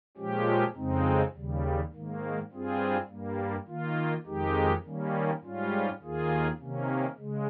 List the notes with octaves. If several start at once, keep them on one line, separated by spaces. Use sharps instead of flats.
A#2 F3 G#3 C#4 G4
F2 C#3 G#3 C4 D#4
D#2 C#3 G3
G#2 D#3 A#3
G2 G3 C4 F4 G#4
G2 G3 A#3
D#3 A#3 F4
F2 D#3 G#3 D#4 G4
D#3 G3 A#3 C#4
G#2 G3 C#4 F4
D#2 D#3 A#3 F4 G#4
C3 D#3 A#3 C#4
C#3 G#3